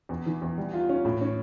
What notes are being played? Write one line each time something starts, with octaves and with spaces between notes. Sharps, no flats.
E2
E3
E2
G3
F4
C#4
A2
C#4